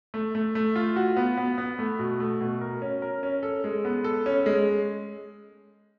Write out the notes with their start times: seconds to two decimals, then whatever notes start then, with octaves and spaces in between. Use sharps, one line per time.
0.14 A3
0.35 A3
0.55 A3
0.76 F4
0.96 F#4
1.17 B3
1.38 B3
1.58 B3
1.79 A3
1.99 B2
2.20 A3
2.40 B2
2.61 A#4
2.82 C#4
3.02 A#4
3.23 C#4
3.43 A4
3.64 G#3
3.85 B3
4.04 A4
4.26 C#4
4.46 G#3